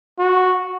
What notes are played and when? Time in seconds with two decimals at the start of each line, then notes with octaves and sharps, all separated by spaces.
0.19 F#4